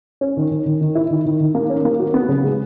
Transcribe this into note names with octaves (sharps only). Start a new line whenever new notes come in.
C#4
D#3
D#3
D#3
D#3
E4
D#3
D#3
D#3
A#3
C#4
A#3
F#4
B3
C#3
G#3